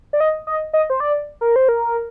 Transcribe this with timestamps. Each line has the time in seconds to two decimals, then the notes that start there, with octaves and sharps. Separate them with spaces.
0.13 D5
0.20 D#5
0.47 D#5
0.73 D#5
0.90 C5
1.00 D5
1.41 A#4
1.56 C5
1.69 A#4